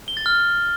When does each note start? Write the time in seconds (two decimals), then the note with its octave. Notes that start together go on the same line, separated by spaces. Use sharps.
0.08 G7
0.17 A6
0.26 F6